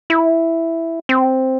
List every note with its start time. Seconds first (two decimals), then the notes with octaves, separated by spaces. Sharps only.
0.10 E4
1.09 C4